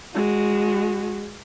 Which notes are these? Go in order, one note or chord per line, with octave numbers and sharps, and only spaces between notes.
G#3 F#4